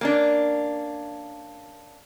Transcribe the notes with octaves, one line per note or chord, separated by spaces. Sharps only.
A#3 C#4 D4